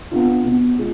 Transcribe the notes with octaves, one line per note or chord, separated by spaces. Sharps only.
B3 D4 F4
B2
G#3 C#4 F4